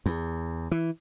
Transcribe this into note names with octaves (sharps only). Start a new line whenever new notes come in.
E2
E3